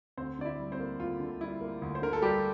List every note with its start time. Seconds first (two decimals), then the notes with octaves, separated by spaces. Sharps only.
0.17 D2 C4 C5
0.39 D3 D5
0.45 E4 E5
0.59 G3
0.72 C4 C5
0.80 A#3
0.99 D2 F4
1.20 D3
1.41 G3 E4
1.61 A#3
1.82 D2
1.95 C5
2.02 D3 A#4
2.13 A4
2.22 G3 G4